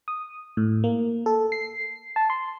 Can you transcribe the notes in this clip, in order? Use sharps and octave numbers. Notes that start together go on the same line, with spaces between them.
D#6
A2
A#3
A4
C7
A5
C6